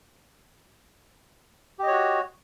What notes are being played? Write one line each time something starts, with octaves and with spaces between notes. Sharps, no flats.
F#4 G4 C#5 D#5